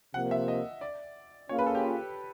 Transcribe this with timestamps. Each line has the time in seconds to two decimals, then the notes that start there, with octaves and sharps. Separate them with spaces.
0.13 C3 F3 A#3 F#5
0.31 E5
0.48 D#5
0.81 D5
1.49 A#3 C#4 F4 G#4 C#5
1.59 B4
1.66 A4
1.75 G4